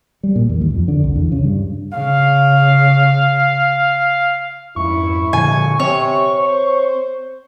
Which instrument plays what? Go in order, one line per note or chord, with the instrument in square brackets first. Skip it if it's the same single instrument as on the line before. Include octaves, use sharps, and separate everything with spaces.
[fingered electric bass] G3
A#2
E2
D#2
F2
D3
C2
E2
C#3
G2
[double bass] C#3 [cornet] F5
[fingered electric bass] F2 G#2 [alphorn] E4 [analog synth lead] C#6
[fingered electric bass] A#2 D3 F3 [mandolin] G#5
[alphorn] C3 [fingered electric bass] C4 [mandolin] C#5
[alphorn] C5